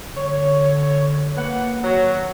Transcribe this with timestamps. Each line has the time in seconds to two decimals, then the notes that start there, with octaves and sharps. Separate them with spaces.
0.16 D3 C#5
1.37 A#3 B4 F#5
1.84 D#3 F#3